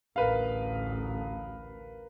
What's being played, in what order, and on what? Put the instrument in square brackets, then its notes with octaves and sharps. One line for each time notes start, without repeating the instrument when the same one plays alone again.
[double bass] A1 D2 [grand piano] A#4 B4 F5